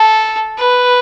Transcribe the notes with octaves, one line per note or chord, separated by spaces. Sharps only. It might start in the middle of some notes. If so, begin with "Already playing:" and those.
Already playing: A4
B4